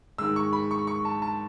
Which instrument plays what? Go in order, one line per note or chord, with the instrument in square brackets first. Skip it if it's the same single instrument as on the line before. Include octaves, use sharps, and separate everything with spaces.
[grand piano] G#2 D#3 G#3 E6
C#6
B5
C#6
C#6
A5
A5